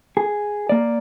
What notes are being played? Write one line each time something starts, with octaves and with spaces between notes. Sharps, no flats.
G#4
A#3 D5